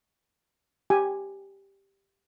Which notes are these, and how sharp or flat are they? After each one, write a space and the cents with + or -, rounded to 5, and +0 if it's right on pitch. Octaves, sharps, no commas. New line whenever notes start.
G4 +0 G#5 +0